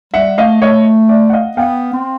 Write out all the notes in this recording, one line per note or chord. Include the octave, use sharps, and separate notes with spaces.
G3 E5 F#5
A3 D#5 F5
A3 C#5 D#5
D5 E5
F#5
D#5 F5
B3 F5 G5
C4